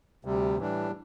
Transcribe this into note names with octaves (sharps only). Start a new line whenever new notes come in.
D2 C3 G3
A2 E3 G3 D4